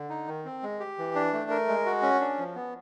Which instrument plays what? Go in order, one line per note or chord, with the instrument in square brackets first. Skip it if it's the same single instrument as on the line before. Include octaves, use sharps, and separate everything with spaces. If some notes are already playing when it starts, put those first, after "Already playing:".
Already playing: [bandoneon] D3
D#4
D#3
C4
G#3
G4
E3
D4
A3
A#4
G#3
F#4
C#4
D4
F3
B3